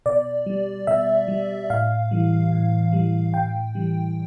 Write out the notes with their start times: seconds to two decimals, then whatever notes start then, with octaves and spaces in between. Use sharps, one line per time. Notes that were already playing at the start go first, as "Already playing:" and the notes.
0.06 B2 D5
0.46 G3
0.87 B2 E5
1.28 G3
1.70 A2 F5
2.11 E3 G3
2.52 A2
2.93 E3 G3
3.33 A2 G5
3.75 E3 G3